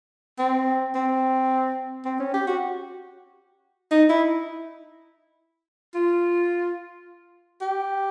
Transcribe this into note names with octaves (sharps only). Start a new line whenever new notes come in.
C4
C4
C4
C#4
G4
F#4
D#4
E4
F4
G4